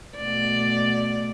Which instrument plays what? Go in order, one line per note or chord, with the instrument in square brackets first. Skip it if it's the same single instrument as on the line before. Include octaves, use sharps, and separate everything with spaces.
[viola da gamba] B2 A3 D5